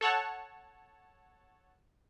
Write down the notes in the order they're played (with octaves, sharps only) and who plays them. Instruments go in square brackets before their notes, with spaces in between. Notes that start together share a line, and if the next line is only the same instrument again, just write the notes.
[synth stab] A4 C#5 F#5 A5